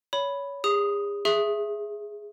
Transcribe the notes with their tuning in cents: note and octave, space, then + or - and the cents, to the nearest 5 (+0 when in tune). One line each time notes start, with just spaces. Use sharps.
C#5 +20 B5 +0
G#4 -40 D#6 +0
G#4 +0 E5 +5 C6 +45